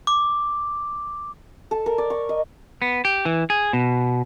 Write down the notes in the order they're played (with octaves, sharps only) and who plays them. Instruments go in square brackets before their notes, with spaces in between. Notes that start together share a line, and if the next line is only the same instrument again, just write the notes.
[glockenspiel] D6
[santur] A4
A#4
D5
C#6
D#5
[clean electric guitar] B3
G4
E3
G#4
B2